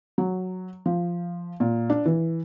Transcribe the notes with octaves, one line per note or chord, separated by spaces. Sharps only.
F#3
F3
A#2
D4
E3